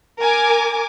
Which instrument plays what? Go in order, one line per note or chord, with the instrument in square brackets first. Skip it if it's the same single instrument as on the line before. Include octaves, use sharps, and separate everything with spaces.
[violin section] A#4 G#5 D6